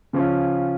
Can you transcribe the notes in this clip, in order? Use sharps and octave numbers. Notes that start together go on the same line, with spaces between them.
C#3 F3 C#4 F4